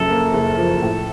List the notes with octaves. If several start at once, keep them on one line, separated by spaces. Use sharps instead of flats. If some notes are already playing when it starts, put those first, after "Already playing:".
Already playing: F#1 F#2 F3 A4
A#3
F#1
F3
A2